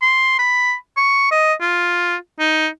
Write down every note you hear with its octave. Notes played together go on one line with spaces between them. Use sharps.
C6
B5
C#6
D#5
F4
D#4